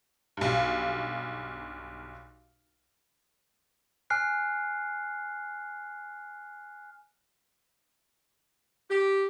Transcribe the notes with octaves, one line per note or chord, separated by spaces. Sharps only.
B1 G2
G#5 F6 F#6 C7
G4